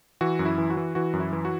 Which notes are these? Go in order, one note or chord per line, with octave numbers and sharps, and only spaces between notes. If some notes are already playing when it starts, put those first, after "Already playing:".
E3 F#4
F#2
E4
E3
F#4
E3
E3 F#4
F#2
E4
E3
F#4